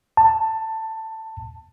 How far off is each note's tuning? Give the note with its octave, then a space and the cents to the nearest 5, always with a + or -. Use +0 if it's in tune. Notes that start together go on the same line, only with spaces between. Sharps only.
A5 +15